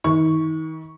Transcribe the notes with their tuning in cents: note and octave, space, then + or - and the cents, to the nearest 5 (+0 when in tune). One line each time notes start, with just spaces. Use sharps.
D#3 +40 C#6 +0